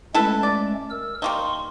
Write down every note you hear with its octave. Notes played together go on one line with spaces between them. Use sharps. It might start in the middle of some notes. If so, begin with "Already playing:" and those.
G#3 A3 C#4 E4 A4 B4
D5
A#4 E6
G3 A#3 D#4 C6 C#6